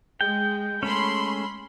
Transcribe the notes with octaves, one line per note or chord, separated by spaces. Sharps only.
G#3 G5
G#3 A3 C#4 B5 C6